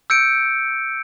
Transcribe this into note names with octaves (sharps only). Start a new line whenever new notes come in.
E6 G6 C#7 D7